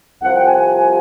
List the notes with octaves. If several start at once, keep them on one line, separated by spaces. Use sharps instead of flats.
C2 C3 F3 F#5
G5
G#5
G#5